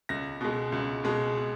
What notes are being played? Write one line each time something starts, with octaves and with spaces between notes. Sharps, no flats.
C#2 A#6
B2 G#3
C#2
B2 G#3